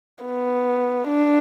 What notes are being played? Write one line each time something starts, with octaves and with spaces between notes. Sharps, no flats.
B3
D4